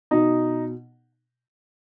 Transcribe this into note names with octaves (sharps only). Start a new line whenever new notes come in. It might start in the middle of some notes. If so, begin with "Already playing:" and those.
B2 D#4